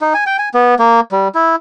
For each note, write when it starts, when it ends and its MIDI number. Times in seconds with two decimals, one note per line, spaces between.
0.01 0.13 63
0.14 0.24 80
0.27 0.37 79
0.39 0.49 80
0.54 0.75 59
0.79 1.00 58
1.12 1.28 55
1.35 1.56 64